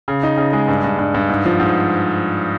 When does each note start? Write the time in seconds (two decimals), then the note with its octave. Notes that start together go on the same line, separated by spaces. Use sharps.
0.08 C#3
0.23 D#4
0.37 C#3
0.53 G#3
0.68 G2
0.84 G2
0.98 G2
1.14 G2
1.29 G#2
1.45 F3
1.60 G#2